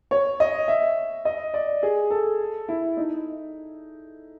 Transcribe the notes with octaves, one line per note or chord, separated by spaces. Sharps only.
C#5
D#5
E5
D#5
D5
G#4
A4
E4
D#4